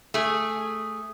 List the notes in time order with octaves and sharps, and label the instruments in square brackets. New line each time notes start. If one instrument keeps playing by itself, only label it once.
[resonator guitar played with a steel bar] A3 G#4